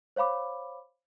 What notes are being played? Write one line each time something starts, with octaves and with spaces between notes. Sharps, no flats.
C5 C#5 F5 B5 D6